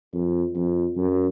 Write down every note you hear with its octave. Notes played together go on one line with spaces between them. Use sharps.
F2
F2
F#2